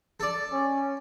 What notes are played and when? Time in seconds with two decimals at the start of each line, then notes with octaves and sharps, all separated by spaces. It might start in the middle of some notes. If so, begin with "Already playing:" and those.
0.20 A4 D5
0.52 C#4